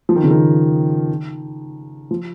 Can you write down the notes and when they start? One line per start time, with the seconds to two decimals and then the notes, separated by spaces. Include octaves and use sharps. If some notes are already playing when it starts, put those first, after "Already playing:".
0.09 F3
0.16 D#3
0.23 C#3
0.31 D#3
2.11 F3